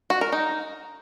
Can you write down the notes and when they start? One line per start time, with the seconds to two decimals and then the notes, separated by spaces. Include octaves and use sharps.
0.10 F#4
0.21 A#4
0.32 D#4